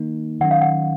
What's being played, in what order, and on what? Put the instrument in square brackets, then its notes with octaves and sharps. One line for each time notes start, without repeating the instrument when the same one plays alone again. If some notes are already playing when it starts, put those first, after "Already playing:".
Already playing: [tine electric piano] D#3 A#3 D#4
[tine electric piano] D#3 F#3 C#4 [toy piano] F#5
[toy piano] F5
F#5